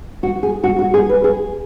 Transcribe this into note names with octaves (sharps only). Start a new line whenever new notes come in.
F#4
G#4
F#4
F#4
G#4
B4
G#4